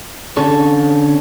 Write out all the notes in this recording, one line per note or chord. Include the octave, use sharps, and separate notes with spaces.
D3 C#4 A4 C#5